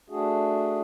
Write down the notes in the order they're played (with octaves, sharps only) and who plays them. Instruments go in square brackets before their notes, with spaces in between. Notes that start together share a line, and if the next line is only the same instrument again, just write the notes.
[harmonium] A3 D4 F#4 G#4